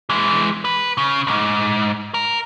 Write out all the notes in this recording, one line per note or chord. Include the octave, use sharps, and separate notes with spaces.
E3 G#3
B4
C#3
B1 G#2
A#4